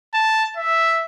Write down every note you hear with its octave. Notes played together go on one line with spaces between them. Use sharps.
A5
E5